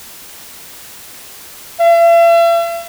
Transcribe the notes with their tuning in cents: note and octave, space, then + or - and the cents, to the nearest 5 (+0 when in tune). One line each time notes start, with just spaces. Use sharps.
E5 +45